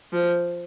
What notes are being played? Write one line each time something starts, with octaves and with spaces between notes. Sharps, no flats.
F3